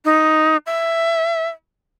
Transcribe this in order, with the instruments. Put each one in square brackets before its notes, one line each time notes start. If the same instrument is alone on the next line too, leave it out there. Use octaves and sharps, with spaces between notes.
[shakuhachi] D#4
E5